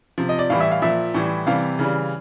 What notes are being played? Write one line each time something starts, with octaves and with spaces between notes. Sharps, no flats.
C3 F3
D#5
D5
A2 E3 G3 F5
E5
F5
A#2 F3 E5
A2 E3 G3
C3 E3 G3 F5
C#3 E3 G3